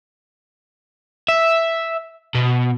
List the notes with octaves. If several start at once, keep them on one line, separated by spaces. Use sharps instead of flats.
E5
B2